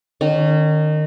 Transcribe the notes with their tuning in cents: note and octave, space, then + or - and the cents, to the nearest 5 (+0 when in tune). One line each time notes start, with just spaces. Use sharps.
D#3 -25 C#4 +0